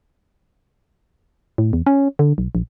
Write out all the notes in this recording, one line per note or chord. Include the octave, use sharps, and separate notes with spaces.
A2
E2
C#4
D3
B1
A#1